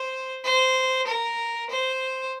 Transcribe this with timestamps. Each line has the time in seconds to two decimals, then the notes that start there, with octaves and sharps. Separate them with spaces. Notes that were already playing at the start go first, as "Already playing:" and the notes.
Already playing: C5
0.44 C5
1.07 A#4
1.70 C5